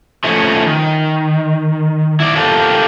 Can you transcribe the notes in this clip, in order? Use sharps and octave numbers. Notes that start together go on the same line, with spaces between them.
F3 A3 C#4 D#4 E4
D#3
E4 D5
D4 F4 G4 A4 A#4